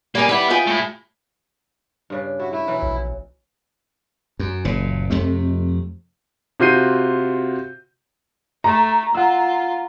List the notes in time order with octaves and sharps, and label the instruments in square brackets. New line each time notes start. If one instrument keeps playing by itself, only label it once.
[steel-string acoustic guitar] G3 G#4 G#5 [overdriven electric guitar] A#3 A#4
[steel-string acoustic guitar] G3 E4 [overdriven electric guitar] B4 F#5
[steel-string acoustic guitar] F4 G#4 G5
[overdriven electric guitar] A3 E4
[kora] G2 C#3 D4
[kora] E4 [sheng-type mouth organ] F#4
[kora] A3 [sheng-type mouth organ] E4
[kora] B2 E3 F#3
[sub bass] A#1
[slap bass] F#2
F#1 A#2
F2 C3 A3
[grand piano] C3 F4 F#4 G6 C7 D#7
[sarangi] A3 [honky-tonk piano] A#5
[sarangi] F4 [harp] F#5 E6